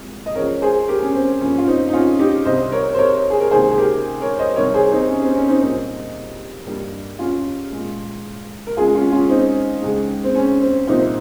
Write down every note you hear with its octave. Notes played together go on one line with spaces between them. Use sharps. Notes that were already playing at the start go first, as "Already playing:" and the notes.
Already playing: C2 A#2 G#3
D#5
C#2 C#3 F3 A#4 C#5
G#4 C5
G4 A#4
C#4
C4
G2 F3 A#3 C#4
F4
C4 D#4
D#4
C#4 F4
D#4 G4
C2 C3 G3 C5 D#5
A#4 C#5
C5
A#4 C#5
G#4
A#4
C#2 C3 D#3 A#3 G#4 C5
G#4
G4 A#4
A#4 C#5
C5 D#5
C2 C3 D#3 G3 A#4 C#5
G#4 C5
C4 D#4
C#4
C4
C#4
C4 D#4
C2 A#2 G3 A#3 C4 D#4
G2 G3 A#3
C#4 F4
A#2 G#3
A#4
C#2 C#3 G#3 F4 G#4
C#4 F4
C#4 F4
C4 D#4
C#2 C#3 G#3
C4
C#4
C4
C2 A#2 F3 A#3 C4 D#4